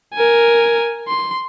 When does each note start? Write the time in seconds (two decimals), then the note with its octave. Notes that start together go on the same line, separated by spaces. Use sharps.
0.14 A#4 G#5
1.08 C6